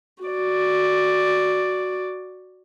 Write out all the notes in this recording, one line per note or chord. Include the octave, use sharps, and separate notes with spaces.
F#4 D5